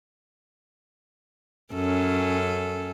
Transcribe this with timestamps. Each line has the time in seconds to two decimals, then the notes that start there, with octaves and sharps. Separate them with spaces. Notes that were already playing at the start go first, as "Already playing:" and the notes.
1.74 F#2 C#4 A4